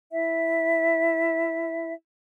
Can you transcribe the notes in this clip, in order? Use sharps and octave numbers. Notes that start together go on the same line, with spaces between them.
E4 E5